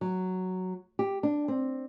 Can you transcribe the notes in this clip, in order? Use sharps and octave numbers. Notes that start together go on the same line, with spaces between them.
F#3
G4
D4
C4